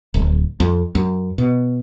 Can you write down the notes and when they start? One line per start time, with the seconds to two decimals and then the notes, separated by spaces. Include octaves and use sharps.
0.14 D1
0.60 F2
0.95 F#2
1.38 B2